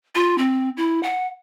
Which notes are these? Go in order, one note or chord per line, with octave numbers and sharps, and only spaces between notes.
F4
C4
E4
F#5